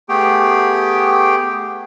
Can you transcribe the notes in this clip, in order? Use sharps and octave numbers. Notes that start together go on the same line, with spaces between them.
A3 B3 G4 G#4 G5